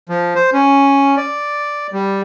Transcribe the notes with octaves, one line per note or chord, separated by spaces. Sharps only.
F3
C5
C#4
D5
G3